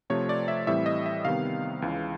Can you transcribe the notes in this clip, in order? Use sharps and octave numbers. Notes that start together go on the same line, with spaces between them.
C3 F3 A3 C4 C#5
D5
E5
A2 E3 G3 C4 E5
D#5
E5
C3 D#3 G3 B3 F5
C#2 C#3 E3 G#3